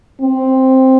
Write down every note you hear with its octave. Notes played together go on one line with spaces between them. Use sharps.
C4